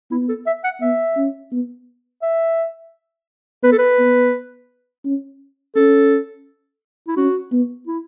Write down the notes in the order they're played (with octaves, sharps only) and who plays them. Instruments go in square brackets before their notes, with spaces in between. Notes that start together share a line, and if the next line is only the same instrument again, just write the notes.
[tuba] B3 [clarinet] E4
[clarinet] A4
E5
F#5
[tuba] B3 [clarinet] E5
[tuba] C#4
B3
[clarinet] E5
[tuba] B3 [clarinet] B4
[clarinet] A4
B4
[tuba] B3
C#4
[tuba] C#4 [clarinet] A4
[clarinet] E4
[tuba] C#4 [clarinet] F#4
[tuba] B3
[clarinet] E4